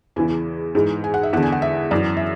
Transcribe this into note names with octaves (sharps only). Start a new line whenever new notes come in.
E2 C#3 E3 G#5
G#2 E3
G#5
F#5
E5
E2 D3 F#5
G#5
F#5
E5
F#2 E3 D5
E5